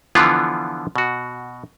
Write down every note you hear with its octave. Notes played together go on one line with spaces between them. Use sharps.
D3 E3 F3 B3 D4 F4
B2 F#4